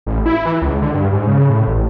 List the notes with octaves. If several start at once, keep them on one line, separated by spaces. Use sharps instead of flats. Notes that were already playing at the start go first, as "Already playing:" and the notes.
A1
E4
E3
C#2
D3
G2
G#2
C#3
A2
A1